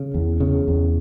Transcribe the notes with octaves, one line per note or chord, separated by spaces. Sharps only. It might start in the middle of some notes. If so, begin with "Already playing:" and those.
Already playing: C#3
E2
C#3
E2